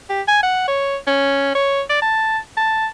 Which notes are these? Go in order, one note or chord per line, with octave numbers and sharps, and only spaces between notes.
G4
G#5
F#5
C#5
C#4
C#5
D5
A5
A5